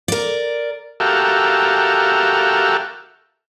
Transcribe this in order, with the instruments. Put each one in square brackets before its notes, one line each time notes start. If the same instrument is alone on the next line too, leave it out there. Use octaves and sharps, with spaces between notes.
[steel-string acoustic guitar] A#4 D5
[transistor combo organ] F#4 G4 A4 A#4 E5 F5